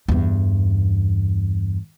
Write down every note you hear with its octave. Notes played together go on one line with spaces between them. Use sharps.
E2 G2